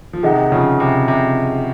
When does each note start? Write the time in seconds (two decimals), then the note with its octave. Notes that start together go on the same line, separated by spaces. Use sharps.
0.13 F3
0.23 C3 D#3 G#4 D#5 F#5
0.52 C#3 F3
0.80 C3
1.08 C3